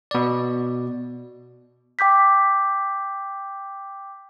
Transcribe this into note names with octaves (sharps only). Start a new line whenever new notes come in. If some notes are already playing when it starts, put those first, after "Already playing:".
B2 D5
G5 D6 G6 B6